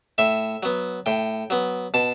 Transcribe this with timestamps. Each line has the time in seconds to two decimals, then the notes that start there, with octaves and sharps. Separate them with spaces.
0.18 A2 E5
0.63 F#3 B3
1.06 A2 G5
1.50 F#3 B3
1.94 B2 A5